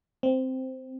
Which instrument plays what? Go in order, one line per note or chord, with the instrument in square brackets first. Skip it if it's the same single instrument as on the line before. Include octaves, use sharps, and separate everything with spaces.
[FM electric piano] C4